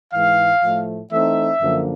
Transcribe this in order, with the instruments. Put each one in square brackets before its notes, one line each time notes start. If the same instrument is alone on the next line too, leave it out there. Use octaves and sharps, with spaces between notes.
[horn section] G#2 E3 G#3 F5
A2 F3 A3
E3 A3 C4 D#4 E5
F#2 D3 F3 A#3